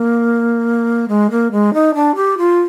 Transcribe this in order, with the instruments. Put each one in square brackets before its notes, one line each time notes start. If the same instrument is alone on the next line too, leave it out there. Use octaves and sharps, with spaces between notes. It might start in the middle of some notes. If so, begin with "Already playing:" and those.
Already playing: [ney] A#3
G#3
A#3
G#3
D#4
D4
G4
F4